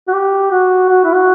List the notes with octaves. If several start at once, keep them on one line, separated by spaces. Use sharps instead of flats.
F#4
G4
F#4
F#4
E4
F#4